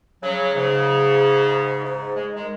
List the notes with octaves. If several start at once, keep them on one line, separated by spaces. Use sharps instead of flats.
C#3 F#3
G#2 C#3
G#2
G#3
D#3 G#3